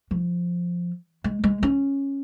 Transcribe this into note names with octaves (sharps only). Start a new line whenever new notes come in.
F3
G#3
G#3
C#4